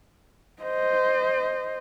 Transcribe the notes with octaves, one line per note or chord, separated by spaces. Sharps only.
C5 D#5